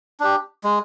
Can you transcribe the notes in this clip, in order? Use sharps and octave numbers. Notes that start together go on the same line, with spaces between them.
D4 G4
G#3